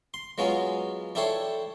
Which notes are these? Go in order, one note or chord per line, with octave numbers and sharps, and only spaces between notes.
C6
F#3 G#3 B3 C#4 F4
D4 E4 G4 A4 C5 C#5